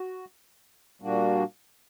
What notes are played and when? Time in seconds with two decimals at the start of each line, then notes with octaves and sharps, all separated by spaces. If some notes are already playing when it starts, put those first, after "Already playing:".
Already playing: F#4
1.02 A#2 G3 A#3 D4 F#4